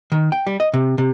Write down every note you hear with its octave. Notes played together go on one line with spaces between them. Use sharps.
D#3
G5
G3
D#5
C3
C3